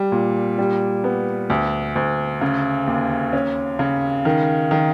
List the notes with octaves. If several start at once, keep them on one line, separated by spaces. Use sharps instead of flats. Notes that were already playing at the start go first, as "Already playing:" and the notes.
Already playing: G3
A#2
G3
B3
D2
D2
C#3
D#2
C#4
C#3
D#3
D#3